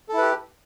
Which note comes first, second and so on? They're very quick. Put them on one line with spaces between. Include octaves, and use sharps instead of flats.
A4 E4 B4 G4